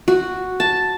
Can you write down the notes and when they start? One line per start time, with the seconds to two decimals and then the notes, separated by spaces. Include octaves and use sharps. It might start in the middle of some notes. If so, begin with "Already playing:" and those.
0.08 F#4
0.60 A5